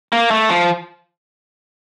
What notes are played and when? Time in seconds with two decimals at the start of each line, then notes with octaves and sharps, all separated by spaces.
0.12 A#3
0.31 A3
0.50 F3